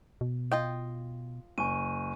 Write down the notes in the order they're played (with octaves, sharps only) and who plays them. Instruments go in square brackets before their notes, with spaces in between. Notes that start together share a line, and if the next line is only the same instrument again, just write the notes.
[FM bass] B2
[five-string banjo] F4 D#5 G5
[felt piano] F#1 [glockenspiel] G#5 C#6 D#7